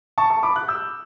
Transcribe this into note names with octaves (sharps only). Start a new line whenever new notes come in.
A5 C#6
A5 C#6
B5 D6
D6 F#6
E6 G6